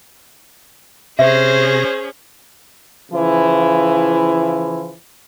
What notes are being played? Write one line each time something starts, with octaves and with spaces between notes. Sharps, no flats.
C3 C#4 G#4 C5 E5 A#6
C#3 E3 F3 E4